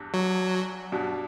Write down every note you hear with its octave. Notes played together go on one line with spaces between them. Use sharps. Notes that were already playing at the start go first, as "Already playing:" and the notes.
Already playing: E2 G2
F#3
G2 B2